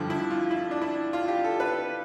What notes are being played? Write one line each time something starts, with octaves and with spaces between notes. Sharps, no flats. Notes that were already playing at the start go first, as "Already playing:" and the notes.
Already playing: G2 D3 F3
E4
F4
E4
D4
E4
F4
G4
A4
B4